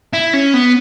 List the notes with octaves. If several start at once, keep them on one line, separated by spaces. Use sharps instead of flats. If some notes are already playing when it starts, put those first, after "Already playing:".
E4
C#4
B3